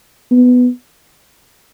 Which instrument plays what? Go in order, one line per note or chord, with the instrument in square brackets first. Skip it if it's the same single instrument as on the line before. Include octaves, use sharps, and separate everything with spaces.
[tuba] B3